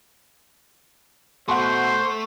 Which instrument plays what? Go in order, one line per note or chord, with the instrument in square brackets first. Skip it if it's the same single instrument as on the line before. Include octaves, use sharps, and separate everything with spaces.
[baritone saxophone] B2 [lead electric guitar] A3 [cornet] C5 [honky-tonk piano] F#5 C6